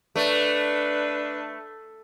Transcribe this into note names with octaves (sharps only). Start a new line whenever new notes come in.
A3 D4 B4